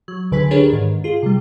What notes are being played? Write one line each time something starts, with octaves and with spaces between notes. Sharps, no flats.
F#3
C#2 D3 B4 G#5 B6
D4 G4 G#4 A#4 B4 C#5
G#2 D#3
F4 G#4
C3 G3